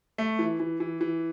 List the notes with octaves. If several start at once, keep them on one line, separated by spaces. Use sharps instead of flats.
A3
E3
E3
E3
E3